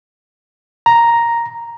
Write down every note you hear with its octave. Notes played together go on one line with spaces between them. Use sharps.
A#5